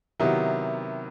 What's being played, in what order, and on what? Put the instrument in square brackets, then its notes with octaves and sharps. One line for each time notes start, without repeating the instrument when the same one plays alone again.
[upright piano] C3 D#3 F#3 B3 E4